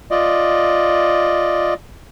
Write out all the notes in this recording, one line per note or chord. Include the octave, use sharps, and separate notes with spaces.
F4 D5 D#5